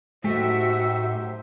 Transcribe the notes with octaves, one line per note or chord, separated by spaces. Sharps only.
F#2 A2 A3 D#4 F#4 G4 C5 E5